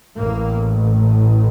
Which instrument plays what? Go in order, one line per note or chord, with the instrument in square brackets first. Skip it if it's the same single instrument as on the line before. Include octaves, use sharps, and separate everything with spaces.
[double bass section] A1 A2 A#3